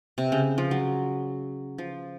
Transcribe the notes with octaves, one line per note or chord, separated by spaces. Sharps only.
C3
C#3
F3
F#3
F3